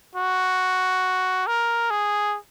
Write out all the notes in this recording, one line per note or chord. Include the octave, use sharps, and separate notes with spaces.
F#4
A#4
G#4